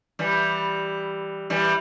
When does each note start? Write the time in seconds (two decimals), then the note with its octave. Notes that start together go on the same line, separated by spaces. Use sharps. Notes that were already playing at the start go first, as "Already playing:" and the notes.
0.19 E3 G3
1.50 E3 G3